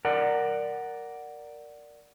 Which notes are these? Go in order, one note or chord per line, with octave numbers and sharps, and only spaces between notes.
A#4 D5 F#5